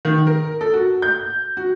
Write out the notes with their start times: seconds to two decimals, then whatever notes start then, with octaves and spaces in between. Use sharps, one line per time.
0.05 D#3
0.27 A#4
0.61 A4
0.73 F#4
1.02 G6
1.57 F#4